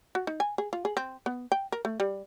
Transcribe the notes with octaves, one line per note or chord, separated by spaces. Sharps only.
F#4
D#4
G#5
G#4
F4
G#4
C4
B3
G5
A#4
A3
G3